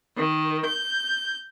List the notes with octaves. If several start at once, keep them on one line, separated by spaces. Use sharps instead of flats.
D#3
G6